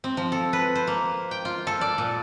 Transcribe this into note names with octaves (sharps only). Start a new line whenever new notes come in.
C4
F3
A4
B4
C5
A#3
G5
F4
A4
D5
A#2